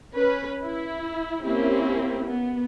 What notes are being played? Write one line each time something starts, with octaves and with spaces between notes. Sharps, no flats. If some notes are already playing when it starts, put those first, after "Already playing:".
C#4 B4
E4
A#3 C4 C#4 E4 G4
B3